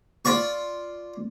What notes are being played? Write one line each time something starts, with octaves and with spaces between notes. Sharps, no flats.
F4 D5 C#6